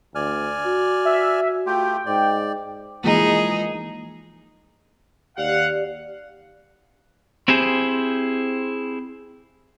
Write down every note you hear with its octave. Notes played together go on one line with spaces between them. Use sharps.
D2 D5 G#5 F6
F#4
E5
A3 F4 G4 G5
G#2 D5
E3 F3 G#3 A#3 D#4 E4 G#4
D#2 G4 D5 F5 F#5
C4 E4 G4 G#4 C5